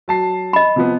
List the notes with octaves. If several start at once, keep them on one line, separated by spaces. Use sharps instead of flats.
F#3 A5 C7
D#5 B5
C3 F3 B3